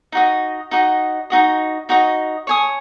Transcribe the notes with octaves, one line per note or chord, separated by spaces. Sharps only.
D#4 F#4 D#5
D#4 F#4 D#5
D#4 F#4 D#5
D#4 F#4 D#5
C#5 G#5 D#6